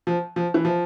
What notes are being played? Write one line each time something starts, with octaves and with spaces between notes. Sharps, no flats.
F3
F3
E3
F3